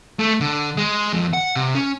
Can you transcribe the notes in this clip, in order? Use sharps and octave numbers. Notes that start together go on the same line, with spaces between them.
A3
D3
G#3
F2
F#5
C3
C#4